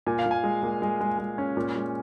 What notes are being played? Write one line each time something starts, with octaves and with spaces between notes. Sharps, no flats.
A#2 G#5
F5
A#2
G#5
G#3
A#2
G#3
G#3
G#3
C#4
A#2
G#3